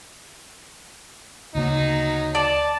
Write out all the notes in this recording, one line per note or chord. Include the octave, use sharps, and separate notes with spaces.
D2 C#3 F#3 A#3 D#4
D5 A5